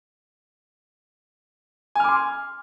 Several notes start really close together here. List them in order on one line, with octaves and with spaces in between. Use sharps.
G#5 F6 D6 C6